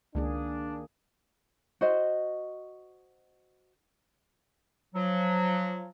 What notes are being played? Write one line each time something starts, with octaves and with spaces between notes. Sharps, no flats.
C#2 D#3 A#3 D4 G#4
F#4 C5 D#5
F3 F#3